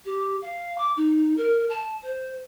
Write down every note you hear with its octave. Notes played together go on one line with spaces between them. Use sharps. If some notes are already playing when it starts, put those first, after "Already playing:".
G4
F5
D6
D#4
A#4
A5
C5